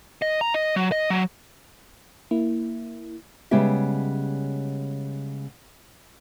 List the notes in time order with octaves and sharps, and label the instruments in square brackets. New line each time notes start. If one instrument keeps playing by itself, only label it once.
[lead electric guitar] D#5
A#5
D#5
F#3
D#5
F#3
[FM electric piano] A#3 E4
[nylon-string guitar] C#3 G3 G#3 B3 G4 E5